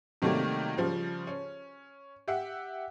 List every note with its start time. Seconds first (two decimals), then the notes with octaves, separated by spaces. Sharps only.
0.22 C3 D#3 F#3 G3 A3 A#3
0.77 C#3 F3 G3
1.27 C#4
2.28 G4 E5 F#5